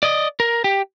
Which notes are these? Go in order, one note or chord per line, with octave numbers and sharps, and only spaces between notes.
D5 D#5
A#4
G4